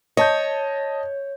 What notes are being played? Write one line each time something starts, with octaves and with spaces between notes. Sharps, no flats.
C#5 D#5 A5 G6